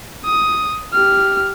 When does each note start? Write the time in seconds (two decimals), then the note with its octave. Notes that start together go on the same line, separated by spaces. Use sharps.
0.24 D#6
0.93 G4 F6